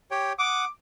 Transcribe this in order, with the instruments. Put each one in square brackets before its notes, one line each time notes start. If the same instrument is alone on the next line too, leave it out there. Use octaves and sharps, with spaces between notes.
[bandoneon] G4 C#5 G5
[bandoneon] F#5 D#6 [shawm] D6